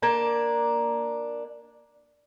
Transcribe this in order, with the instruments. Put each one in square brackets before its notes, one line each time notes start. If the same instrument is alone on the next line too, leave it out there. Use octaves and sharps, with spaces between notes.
[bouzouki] A#3 D4 A5